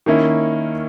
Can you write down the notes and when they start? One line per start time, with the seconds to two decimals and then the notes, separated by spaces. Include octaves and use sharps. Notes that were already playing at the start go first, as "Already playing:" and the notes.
0.06 D#3 A#3 C#4 E4